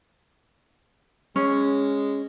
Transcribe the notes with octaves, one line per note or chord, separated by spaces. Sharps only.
G#3 C#4